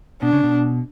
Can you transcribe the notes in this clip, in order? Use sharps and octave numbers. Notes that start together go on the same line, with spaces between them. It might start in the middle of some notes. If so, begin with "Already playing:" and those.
B2 D4
C#3
B2